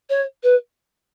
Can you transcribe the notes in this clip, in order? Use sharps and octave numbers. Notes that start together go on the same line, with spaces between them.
C#5
B4